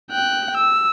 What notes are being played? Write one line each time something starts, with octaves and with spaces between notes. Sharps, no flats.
G5 F#6
E6